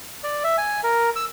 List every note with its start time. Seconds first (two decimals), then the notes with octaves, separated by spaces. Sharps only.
0.24 D5
0.44 E5
0.58 G#5
0.84 A#4
1.16 E6